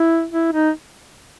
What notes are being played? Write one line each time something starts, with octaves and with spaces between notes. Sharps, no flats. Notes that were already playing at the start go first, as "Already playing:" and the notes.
Already playing: E4
E4
D#4